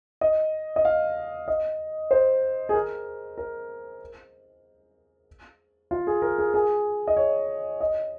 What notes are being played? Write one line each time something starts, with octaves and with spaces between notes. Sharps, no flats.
D#5
D#5
F5
D#5
C5
G#4
A#4
A#4
F4
G#4
A#4
G#4
G#4
D#5
C#5
D#5